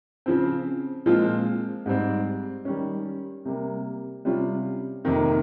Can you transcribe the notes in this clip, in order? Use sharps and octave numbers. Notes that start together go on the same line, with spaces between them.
C#3 F3 C4
A#2 F3 G#3 C4 F4
G#2 G3 C4
D#3 G3 C#4
C3 G3 A#3
C3 G3 C#4 F4
F2 C3 D#3 A#3